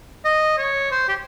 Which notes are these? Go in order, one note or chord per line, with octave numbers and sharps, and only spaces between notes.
D#5
C#5
C5
G4